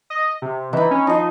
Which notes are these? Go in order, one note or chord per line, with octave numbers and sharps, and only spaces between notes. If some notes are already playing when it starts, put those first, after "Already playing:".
D#5
C3
E3 D#4 B5
C#4
F3 D#4 D#5